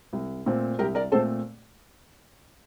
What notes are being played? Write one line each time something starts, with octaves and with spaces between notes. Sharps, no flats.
C2
A#2 A3 C4
C2 G4 A#4
A#4 D5
A#2 A3 C4 A4 C5